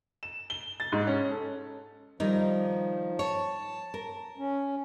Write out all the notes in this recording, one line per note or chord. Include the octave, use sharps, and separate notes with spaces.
E7
G7
A6
G#2
C#4
A4
D#3 F3 G3 D#4
C#5 A5
A#4
C#4